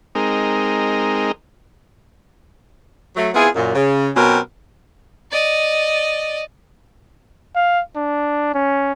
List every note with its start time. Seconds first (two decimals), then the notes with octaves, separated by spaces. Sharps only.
0.15 G#3 C4 D#4 A#4
3.16 F#3 A3
3.34 B3 C4 E4 F4 G#4
3.55 F#2 A#2
3.75 C#3
4.15 B2 F#3 C4 C#4 G4 A#4
5.31 D5 D#5
7.55 F5
7.96 D4
8.54 C#4